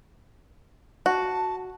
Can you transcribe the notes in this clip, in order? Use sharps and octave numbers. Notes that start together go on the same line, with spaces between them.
F#4 A5